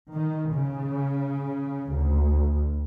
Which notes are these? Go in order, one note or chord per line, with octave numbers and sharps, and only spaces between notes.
D#3
C#3
D2